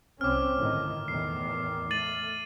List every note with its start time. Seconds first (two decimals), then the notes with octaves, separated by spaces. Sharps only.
0.21 C2 C4 C#4 D6 F6
0.56 G1 A2 D#3
1.08 E2 A2 D#3 C7
1.91 A3 A6 D#7 F#7